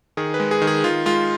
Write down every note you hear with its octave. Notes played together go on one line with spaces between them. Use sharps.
D#3 G#4
B4
G#3
G#4
D#3
G#4
D#3 F4
G#3 F4